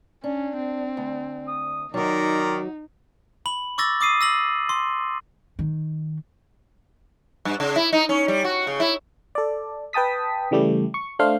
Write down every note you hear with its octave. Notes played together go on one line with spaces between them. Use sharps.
C#4 D4
C4
D2
D#6
D#3 F#3 D#4 F#4 A#4 D5
B5 F#7
C#6 D6 E6 A6 A#6
D6 D#6 C7 D#7
E6 A#6 F#7
C6
D#3
G2
C#3
E4
D#4
C#4
G3
F#4
C#3
E4
A4 D5
B4 G5 A5 D#6 B6
C#3 E3 G3 A3 G4
C#6
A3 D4 C5 F5